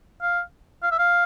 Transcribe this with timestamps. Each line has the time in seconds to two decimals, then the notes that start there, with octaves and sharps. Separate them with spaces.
0.22 F5
0.83 F5
0.92 E5
0.99 F5